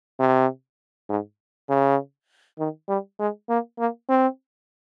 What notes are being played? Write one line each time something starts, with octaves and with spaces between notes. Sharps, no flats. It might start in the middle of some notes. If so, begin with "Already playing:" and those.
C3
G#2
C#3
D#3
G3
G#3
A#3
A#3
C4